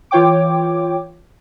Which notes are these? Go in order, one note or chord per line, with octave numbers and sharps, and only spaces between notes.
E3 F4 C#5 G5 D6